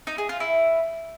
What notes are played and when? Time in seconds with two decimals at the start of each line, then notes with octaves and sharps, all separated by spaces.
0.07 D#4
0.18 G#4
0.29 F4
0.40 E4